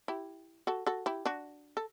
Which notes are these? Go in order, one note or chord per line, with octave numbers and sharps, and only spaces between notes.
E4 G4
F#4 A4
F#4 A4
E4 G4
D4 F#4
A4